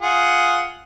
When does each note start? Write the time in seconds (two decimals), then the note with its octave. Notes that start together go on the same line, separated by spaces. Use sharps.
0.02 F4 G#4 F#5